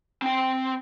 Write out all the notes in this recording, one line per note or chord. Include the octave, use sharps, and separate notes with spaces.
C4 G5